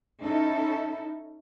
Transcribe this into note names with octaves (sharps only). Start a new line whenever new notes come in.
C#4 D#4 E4 A4